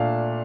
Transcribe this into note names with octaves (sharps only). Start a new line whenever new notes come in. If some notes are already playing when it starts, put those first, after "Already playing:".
Already playing: A#2 A3 D4 F5